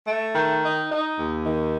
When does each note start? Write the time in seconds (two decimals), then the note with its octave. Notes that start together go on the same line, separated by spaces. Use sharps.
0.06 A3
0.34 D#3
0.61 D#4
0.88 D#4
1.17 D#2
1.44 D#3